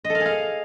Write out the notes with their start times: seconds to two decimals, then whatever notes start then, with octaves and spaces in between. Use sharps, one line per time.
0.05 D#5
0.10 A4
0.15 F5
0.20 G#4
0.25 F5